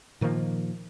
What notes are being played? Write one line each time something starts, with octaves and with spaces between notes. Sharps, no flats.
A#2 D#3 F3 A#3